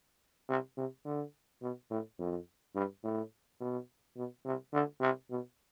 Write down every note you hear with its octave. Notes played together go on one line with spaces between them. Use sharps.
C3
C3
D3
B2
A2
F2
G2
A2
B2
B2
C3
D3
C3
B2